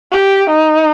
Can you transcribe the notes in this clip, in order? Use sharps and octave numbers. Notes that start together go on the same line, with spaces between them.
G4
D#4